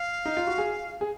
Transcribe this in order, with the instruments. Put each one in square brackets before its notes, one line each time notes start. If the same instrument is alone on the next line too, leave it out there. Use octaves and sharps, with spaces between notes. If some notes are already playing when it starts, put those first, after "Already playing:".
Already playing: [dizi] F5
[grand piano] D#4
F4
F#4
G#4
G#4